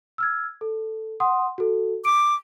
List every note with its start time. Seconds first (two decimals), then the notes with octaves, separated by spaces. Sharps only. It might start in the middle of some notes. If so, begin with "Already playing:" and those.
0.18 E6 F6 G#6
0.61 A4
1.20 F#5 C6 D#6
1.58 F#4 A4
2.05 D6 D7